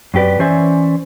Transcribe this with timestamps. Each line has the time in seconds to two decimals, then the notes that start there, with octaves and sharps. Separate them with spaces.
0.14 F#2 C4 G4 B4 D5
0.39 E3 C#4 C5 D5 E5 G#5